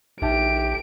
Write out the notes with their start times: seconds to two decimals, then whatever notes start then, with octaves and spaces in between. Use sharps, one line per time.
0.22 A#1 D#4 G4 E5 A5 D7